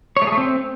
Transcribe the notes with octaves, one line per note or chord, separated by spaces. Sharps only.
C#5
A3
G#4
A3
C4